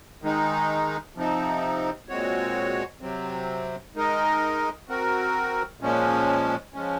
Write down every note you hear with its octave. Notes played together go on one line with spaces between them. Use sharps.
D#3 G#3 D#4
C3 F3 C4 D#4
A#2 G#3 C4 F#4 C#5
C3 F#3 C4
G#3 D#4 A#4 D#5
C4 F#4 A#4
A#2 F3 G#3 C#4
F3 G#3 C#4